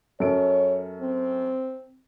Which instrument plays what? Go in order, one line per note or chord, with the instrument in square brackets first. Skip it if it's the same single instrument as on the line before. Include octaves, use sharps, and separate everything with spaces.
[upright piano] F#2 A4 D7 [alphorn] C#5
[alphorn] C4